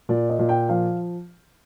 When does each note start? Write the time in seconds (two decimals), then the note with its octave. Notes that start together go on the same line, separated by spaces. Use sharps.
0.09 A#2 D5
0.30 D#5
0.39 A#2
0.49 G5
0.69 F3 F5